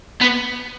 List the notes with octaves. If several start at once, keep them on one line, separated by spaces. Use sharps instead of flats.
B3